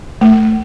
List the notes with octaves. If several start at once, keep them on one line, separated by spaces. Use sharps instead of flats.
A3